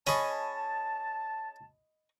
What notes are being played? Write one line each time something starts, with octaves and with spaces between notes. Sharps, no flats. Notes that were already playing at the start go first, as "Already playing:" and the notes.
C#4 G#4 D#5 A5 B5 C#6